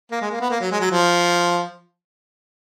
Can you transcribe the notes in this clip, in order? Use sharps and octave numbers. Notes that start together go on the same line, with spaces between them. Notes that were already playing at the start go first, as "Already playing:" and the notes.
A#3
G#3
A#3
B3
A#3
F#3
G#3
F#3
F3